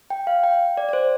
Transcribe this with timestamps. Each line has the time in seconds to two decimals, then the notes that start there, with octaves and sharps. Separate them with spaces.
0.10 G5
0.27 F5
0.44 G5
0.77 D5
0.89 D5
0.93 C5